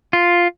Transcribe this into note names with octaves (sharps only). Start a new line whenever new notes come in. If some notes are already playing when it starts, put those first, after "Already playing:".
F4